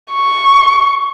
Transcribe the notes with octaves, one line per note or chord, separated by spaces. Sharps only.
C#6